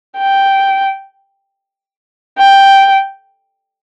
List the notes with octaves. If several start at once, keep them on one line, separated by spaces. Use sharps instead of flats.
G5
G5